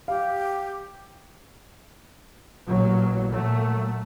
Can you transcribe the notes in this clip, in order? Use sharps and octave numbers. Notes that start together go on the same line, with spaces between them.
G4 F5
A1 A#2 F#3
A#2 F#3 A3